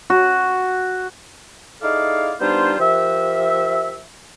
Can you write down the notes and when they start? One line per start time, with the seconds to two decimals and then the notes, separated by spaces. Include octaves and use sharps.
0.10 F#4
1.82 D#4 E4 G#4 A4 D5 F5
2.40 G3 B3 D4 D#4 F4 C5
2.79 F3 G4 A#4 E5